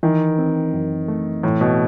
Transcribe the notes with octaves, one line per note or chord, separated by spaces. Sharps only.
D#3 E3
C4
F#2
A3
A2 E3
B2